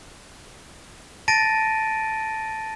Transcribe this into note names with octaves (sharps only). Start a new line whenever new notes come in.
A5 A6 A#6 D7 D#7